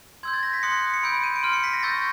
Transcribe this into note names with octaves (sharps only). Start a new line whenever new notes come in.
C6 E6 G6 G#6
A6
A#6
B6
C6 D#6 F#6 C#7
C#7
B5 E6 G6 D7
D#7
D7
C6 F6 D#7
C#7
B6
A#6
C#6 E6 G6 A6